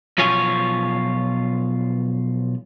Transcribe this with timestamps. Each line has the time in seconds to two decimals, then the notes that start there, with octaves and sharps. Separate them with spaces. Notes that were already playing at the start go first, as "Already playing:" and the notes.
0.18 B1 F3 F4 C#5 G#5